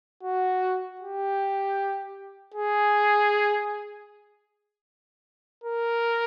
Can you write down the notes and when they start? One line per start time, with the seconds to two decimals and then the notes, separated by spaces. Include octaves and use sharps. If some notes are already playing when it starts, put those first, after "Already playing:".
0.23 F#4
1.01 G4
2.54 G#4
5.64 A#4